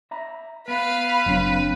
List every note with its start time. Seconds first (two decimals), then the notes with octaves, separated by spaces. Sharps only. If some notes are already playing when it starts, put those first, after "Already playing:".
0.11 E5 A#5 B5
0.68 B3 B4 F5 B5
1.26 F#1 F#3 C4 D4